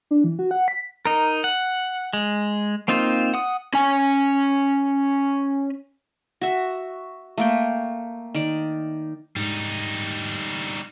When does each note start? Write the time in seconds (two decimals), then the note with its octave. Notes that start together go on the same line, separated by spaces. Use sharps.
0.11 D4
0.24 E3
0.39 F#4
0.51 F#5
0.68 B6
1.05 D#4 A#4
1.44 F#5
2.13 G#3
2.88 A#3 C4 D#4 F4 C5
3.34 F#5 D#6
3.74 C#4 G#5
6.41 F#4 E5
7.38 A3 A#3 G5
8.35 D#3 D5
9.36 G#2 G3 D#4